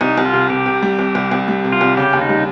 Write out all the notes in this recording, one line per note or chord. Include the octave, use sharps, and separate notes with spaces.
C2 D#4
C2
F4
C3
C3 G4
C3
G3
C2
C2
C2
G3
C3
F4
C2
C#3 G4
D#2
D#4
G3